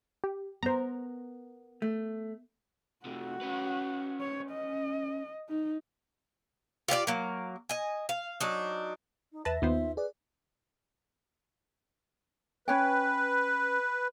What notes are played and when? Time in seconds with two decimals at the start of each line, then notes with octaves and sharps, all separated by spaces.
0.24 G4
0.63 B3 A#4 C5 A#5
1.82 A3
3.06 C3 A3 F#4
3.42 C#4 B4
4.21 C#5
4.51 D#5
5.49 D#4
6.88 F4 G4 C#5 D5
7.07 F#3 A#3
7.69 D#5 G#5
8.09 F5
8.40 F#3 D4 D#4
9.32 D#4
9.45 E2 B4 E5 A5 A#6
9.62 D#2 B3 D#4 F4 C5
9.97 G#4 B4 D5
12.68 C#4 B4 C#5 G5